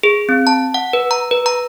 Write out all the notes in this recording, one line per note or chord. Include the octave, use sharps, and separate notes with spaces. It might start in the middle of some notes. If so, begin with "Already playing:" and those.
G#4
C4
A5
F#5
B4
A#5
B4
A#5